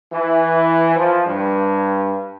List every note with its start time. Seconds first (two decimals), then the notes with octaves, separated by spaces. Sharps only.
0.11 E3
0.96 F3
1.27 G2